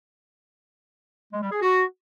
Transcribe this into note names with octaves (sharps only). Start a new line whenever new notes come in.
G#3
G3
G#4
F#4